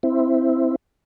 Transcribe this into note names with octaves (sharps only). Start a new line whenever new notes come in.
C4 E4